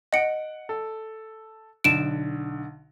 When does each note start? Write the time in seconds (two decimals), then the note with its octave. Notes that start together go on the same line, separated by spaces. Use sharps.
0.13 D#5 F#5 C#7 D7
0.69 A4
1.84 B1 D3 D7 E7